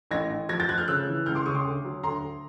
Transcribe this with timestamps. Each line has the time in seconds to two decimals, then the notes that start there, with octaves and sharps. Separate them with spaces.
0.11 A1 G#6 A#6
0.30 A1
0.49 F3 G#6 A#6
0.60 G6 A6
0.69 F3 F#6 G#6
0.78 F6 G6
0.88 C#3 E6 F#6
1.07 E3
1.26 C#2 F6 G6
1.35 C6 D6
1.46 C#3 C#6 D#6
1.55 C6 D6
1.65 D2
1.84 F#3
2.03 D2 A#5 C6
2.22 D2